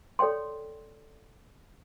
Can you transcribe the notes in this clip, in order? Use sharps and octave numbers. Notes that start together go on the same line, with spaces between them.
A4 C#5 D5 G5 C6